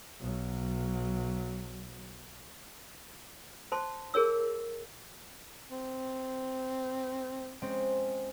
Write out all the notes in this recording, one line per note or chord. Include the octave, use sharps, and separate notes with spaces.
B1 F#3
C5 A5 C6
G#4 A#4 C#5 E6
C4
G#3 C4 C#4